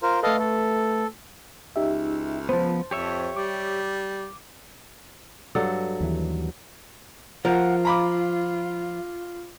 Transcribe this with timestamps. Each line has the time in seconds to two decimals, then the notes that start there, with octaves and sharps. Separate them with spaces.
0.02 F4 A#4 C5
0.23 A3 A4 B4 D#5 F5
0.39 A4
1.76 C#2 D#4 G4 E5
2.49 F3 B3 C5 A5
2.91 F2 G4 C#5 E5
3.36 G3 D6
5.55 G2 F#3 A4
6.00 D#2 E3
7.45 F3 F4 A#4 F#5
7.85 F5 A#5 B5 D6